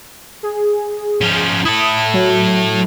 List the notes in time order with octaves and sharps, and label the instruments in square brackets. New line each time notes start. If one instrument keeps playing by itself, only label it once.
[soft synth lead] G#4
[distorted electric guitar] F3 C#4
[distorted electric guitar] E4 A4 [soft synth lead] D#6
[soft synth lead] F#3